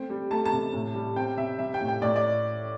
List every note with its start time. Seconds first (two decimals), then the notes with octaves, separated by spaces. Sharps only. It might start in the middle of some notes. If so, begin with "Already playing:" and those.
Already playing: A3 C4 G5
0.10 G3
0.31 A3 A5
0.45 A5
0.51 C3
0.73 A2
0.94 G3
1.16 C4 G5
1.37 C3 E5
1.59 G3 E5
1.74 G5
1.81 A2
1.88 G5
2.02 A2 D5
2.16 D5